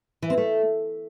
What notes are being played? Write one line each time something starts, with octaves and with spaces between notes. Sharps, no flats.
E3
C4
A3